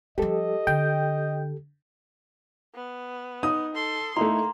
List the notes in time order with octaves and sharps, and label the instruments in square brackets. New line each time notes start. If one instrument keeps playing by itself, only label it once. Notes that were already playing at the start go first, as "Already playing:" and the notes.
[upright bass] F3 G3 [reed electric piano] G4 A4 [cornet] D#5
[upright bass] D3 [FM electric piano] G5
[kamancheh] B3
[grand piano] D#4 [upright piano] D#6
[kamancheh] A4 C6
[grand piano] A3 D#4 E4 [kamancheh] A#3 [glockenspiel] A#5 C6